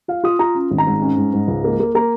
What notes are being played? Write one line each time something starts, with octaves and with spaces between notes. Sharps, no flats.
F4 F5
F4 D#6
F4 A#5
C#4
G#1
A#5
G#2
C#4
G#2
G#2
C#2
A#3
A#3
A#3 A#5